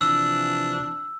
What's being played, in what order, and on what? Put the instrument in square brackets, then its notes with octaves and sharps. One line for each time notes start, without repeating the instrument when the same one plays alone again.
[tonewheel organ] C3 E3 F3 [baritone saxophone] D4 [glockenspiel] E6